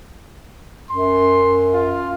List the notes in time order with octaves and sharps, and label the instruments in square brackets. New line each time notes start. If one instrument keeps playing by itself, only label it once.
[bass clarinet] F#2 [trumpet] C6
[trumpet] F4